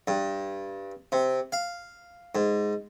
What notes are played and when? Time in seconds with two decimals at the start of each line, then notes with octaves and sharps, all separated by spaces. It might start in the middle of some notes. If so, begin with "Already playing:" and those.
0.08 G2
1.12 C3
1.52 F5
2.35 G#2